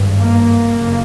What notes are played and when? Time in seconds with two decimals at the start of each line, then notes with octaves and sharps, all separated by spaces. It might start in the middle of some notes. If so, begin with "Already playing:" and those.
Already playing: G#1 G2
0.19 A#3
0.73 F#1 F2 C#3